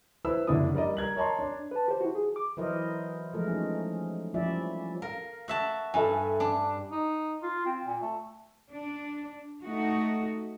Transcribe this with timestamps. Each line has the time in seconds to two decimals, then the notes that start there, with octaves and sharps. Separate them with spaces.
0.25 E4 B4 C5 E6
0.47 F#1 D3 D4 E4 D#6
0.74 G3 A#4 D5 D#5
0.97 A#4 G#6 F#7
1.16 C#5 D#5 A5 A#5 C6
1.39 D4
1.71 B4 A5
1.88 G4 C5
2.01 E4 F#4
2.15 G#4
2.36 D6
2.57 E3 F#3 E4 A#4 C5 D#5
3.33 F3 F#3 G#3 A3 A#4
3.47 C#4 D#4
4.34 F3 G3 C#4 E4 D5 E5
5.02 A#4 F5
5.48 F#4 E5 A5
5.94 G2 A4 E5 G#5
6.40 D4
6.91 D#4
7.42 F4
7.66 C4
7.85 A#2
8.01 A3
8.69 D4
9.63 A3 D#4 F#4